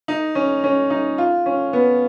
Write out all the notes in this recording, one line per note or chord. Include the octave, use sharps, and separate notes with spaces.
D#4
C#4
C#4
D#4
F4
C#4
B3